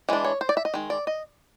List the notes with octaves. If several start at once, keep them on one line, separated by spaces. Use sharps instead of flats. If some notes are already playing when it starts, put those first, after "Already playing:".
E3 G#3 D4
C#5
C5
D5
E5
D#5
D#3 G#3
D5
D#5